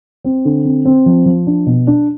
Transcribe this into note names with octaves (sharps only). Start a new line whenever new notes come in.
C4
D3
C4
C4
F3
F3
D4
B2
D4